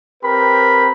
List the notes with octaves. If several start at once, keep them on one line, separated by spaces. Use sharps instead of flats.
C4 G4 A#4 B4 B5